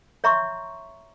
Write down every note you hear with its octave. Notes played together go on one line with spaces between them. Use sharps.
C#5 E5 A#5 C6 C#6